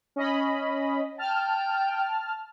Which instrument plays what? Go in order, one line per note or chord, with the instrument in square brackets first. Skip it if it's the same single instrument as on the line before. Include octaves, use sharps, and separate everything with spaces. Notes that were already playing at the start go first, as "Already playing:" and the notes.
[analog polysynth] C#4 D#5 B5
[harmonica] G5 [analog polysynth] A5 F6